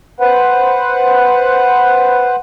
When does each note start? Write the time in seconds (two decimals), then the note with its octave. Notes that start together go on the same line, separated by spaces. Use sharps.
0.20 B4 C5 F#5